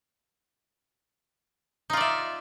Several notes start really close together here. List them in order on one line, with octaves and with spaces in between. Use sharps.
D#4 F4 D5 E5